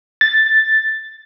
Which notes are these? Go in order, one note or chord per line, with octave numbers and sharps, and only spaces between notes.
A6